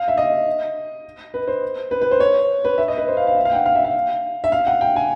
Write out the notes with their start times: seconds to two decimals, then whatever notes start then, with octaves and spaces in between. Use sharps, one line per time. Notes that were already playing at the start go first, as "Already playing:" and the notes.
Already playing: F5
0.08 E5
0.17 D#5
1.34 B4
1.47 C5
1.91 B4
2.02 B4
2.11 C5
2.20 C#5
2.65 B4
2.78 E5
2.88 D#5
2.97 B4
3.08 C5
3.17 F5
3.27 F5
3.36 E5
3.45 F5
3.52 G5
3.55 F#5
3.66 F5
3.75 E5
3.84 F5
4.44 E5
4.52 F5
4.67 F#5
4.81 G5
4.96 G#5